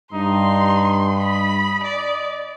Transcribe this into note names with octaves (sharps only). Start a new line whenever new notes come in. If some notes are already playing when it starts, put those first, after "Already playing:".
G2 D#4 C6
D#5 B5
D5